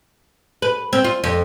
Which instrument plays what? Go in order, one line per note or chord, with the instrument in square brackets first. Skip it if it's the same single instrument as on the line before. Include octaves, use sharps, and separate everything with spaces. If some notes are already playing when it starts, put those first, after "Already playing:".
[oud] B4
C4
F4
F2